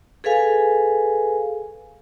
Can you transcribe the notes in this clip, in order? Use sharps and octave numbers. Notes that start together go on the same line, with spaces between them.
G#4 A4 B4 F5 G#5